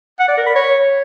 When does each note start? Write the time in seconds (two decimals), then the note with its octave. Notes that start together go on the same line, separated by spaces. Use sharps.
0.20 F#5
0.28 D5
0.37 A#4
0.46 B5
0.55 C#5